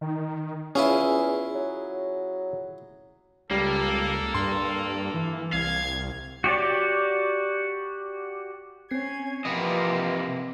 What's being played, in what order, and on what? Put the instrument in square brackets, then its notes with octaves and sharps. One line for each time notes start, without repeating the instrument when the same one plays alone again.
[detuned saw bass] D#3
[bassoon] E2 [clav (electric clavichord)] C#4 [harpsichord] E4 F4 G#4
[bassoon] F#3
[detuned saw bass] C#2 [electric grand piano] G3 [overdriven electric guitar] A#3 [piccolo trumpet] A4
[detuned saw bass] G2 [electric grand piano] C6
[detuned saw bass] E3
[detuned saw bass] C2 [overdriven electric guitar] F5 [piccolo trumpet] G#6
[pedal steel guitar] F#4 G4 C#5 D5
[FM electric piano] C4 C7 [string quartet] C#4 G#6
[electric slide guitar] C3 B4 D#5 [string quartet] E3 F3 A#3